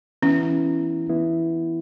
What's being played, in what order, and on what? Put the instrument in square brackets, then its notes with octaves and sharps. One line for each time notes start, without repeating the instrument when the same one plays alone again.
[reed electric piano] E3 B3 E4 [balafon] C#4
[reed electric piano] E3 B3 E4